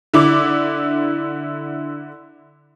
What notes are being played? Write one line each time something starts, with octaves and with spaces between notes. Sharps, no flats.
D3 E4 D6